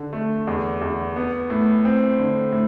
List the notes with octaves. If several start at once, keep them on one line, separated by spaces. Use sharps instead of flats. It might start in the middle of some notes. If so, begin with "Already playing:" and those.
Already playing: D3
A3
E2
E2
B3
A2
C4
D3
A2